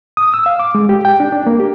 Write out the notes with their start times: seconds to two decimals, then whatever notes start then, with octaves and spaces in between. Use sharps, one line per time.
0.17 D#6
0.34 E6
0.46 F5
0.59 D6
0.75 G#3
0.89 G4
1.05 G5
1.20 D4
1.32 D4
1.47 A#3
1.60 G4